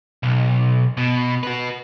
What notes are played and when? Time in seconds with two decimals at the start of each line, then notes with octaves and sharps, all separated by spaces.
0.23 B1
0.97 B2
1.43 F#4 B4